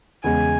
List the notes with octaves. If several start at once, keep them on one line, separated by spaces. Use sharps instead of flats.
E2 C#3 G#3 G#5